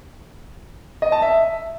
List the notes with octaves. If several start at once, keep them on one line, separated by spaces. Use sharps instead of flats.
D#5
A5
E5